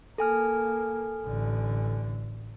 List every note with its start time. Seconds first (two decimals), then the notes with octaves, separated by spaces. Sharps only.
0.18 A#3 A4 G#5 F6
1.26 A1 D3